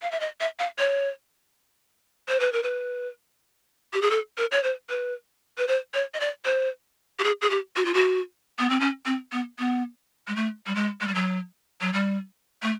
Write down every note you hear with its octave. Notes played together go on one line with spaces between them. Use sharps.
F5
E5
D#5
E5
F5
C#5
C5
B4
A#4
B4
G4
G#4
A4
A#4
C#5
C5
B4
B4
C5
C#5
D#5
D5
C5
G4
G#4
G#4
G4
F#4
F4
F#4
B3
C4
C#4
C4
B3
B3
G#3
A3
G3
G#3
G#3
G3
F#3
F#3
G3
A3